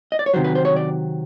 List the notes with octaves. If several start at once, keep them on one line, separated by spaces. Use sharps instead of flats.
D#5
D5
C#5
C3 D#3 F#3 C5
B4
C5
C#5
D5